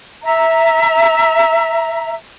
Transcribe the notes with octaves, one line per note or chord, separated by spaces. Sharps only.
E5 A#5